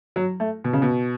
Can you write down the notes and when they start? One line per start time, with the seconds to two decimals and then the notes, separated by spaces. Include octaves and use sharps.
0.16 F#3
0.40 A3
0.64 B2
0.73 C#3
0.82 B2